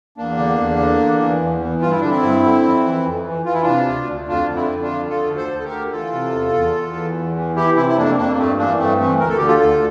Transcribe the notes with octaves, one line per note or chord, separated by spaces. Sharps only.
E2 A#3 D4
D3
E2
D3
E2
E3
E2
E3
G2 F4
E4
D3 D4
C4 E4
G2
D3
F2
E3
F2
E3
E3 F4
E4
C3 D4 F4
D2
D2
F2 D4 F4
D3
C4 E4
F2
D4 F4
D3
D2 F4 A4
D3
A4 C5
D2
A4
G4 A#4
D3
E3 F4 A4
C3
E2
E2
E2
E3
E2
E3
E3 E4 G4
C3 C4 E4
E4
F2 A#3 D4
C4
F2 A#3 D4
A#3
G2 A3 C4
E3 A#3 D4
G2 A3 C4
E3 A3 C4
D2 A#4
A4
D3 G4
F4 A4
D2